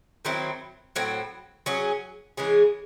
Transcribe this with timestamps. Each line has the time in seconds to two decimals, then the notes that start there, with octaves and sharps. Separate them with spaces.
0.25 D#3 F#3 C4 E4
0.96 A2 F#3 C4
1.66 F#3 C#4 G#4
2.37 E3 G#3 C#4 G#4